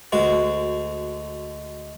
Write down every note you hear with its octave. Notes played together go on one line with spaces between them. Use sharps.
D2 G#3 F#4